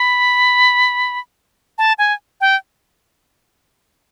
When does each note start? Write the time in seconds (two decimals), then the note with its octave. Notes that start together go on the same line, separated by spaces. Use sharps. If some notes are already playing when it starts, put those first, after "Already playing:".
Already playing: B5
1.78 A5
1.98 G#5
2.41 G5